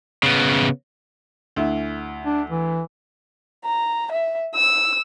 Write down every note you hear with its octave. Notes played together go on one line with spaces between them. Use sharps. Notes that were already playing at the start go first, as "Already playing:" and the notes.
C#3 B3
D2 E4
D4
E3
A#5
E5
E6